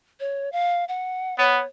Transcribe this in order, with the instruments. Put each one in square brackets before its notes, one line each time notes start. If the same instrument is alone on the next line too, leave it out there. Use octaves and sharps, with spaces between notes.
[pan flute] C#5
F5
F#5
[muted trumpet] B3 [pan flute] C#5